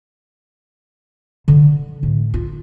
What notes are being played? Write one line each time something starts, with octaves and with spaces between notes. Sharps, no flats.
D3
A2
F4